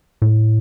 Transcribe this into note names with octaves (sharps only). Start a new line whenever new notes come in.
A2